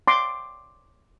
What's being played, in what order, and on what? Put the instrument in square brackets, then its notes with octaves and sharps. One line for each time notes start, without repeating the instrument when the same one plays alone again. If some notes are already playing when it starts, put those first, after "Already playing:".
[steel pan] C6 D6